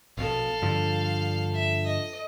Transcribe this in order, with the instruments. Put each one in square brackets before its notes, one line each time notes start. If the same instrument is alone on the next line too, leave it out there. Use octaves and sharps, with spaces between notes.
[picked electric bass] A#1 B2 [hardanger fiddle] A4 F5
[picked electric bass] G2 D3 F3
[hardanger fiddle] E5
D#5